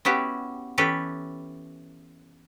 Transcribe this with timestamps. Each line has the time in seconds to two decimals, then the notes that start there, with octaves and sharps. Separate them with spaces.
0.05 B3 C#4 E4 F#4 G4
0.78 E3 C#4 G4 A4 B4